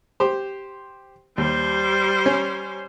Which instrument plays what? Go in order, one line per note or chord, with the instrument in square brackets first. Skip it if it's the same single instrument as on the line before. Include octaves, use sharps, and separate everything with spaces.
[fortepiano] G4 C5
[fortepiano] D#2 [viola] G3 C5
[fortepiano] C#4